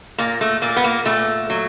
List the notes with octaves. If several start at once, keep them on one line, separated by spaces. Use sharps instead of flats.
A#2 A#3
A3
A#2 A#3
B3
A#3
A#2 A3
F#3